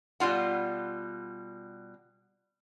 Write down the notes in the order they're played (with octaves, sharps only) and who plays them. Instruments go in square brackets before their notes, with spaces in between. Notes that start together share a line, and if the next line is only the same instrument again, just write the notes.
[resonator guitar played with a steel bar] B2 G3 F4 F#5